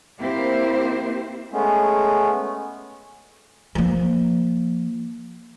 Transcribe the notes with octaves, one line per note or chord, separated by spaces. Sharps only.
A#3 C4 E4 G4 C5
G#3 A3 B3 C#4
F3 A#3